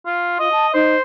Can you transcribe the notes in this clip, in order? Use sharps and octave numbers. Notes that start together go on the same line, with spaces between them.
F4
F4 D#5
A5
D#4 C5